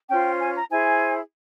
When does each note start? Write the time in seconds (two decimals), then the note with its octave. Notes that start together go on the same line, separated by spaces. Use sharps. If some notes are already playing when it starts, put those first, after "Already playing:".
0.09 C#4 F4 C5 G5
0.40 G#5
0.55 A#5
0.70 E4 G#4 C5 G#5